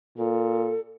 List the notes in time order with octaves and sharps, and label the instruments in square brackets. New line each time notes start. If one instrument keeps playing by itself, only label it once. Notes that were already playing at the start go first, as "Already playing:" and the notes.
[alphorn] A#2 [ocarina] A4